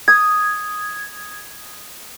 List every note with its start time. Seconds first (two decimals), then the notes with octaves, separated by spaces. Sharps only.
0.08 D#6 G#6